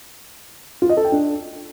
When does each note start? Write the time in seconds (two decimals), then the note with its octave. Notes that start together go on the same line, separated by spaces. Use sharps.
0.82 F4
0.89 D#5
0.97 A4
1.05 G5
1.12 D4